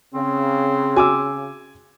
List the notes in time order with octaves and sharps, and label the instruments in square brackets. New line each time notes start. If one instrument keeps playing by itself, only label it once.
[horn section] C#3 [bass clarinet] C4
[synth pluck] F#4 [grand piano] G#5 D6 E6